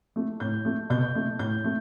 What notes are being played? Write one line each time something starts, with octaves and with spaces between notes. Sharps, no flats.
A3
A2 G6
A3
B2 G6
A3
A2 G6
A3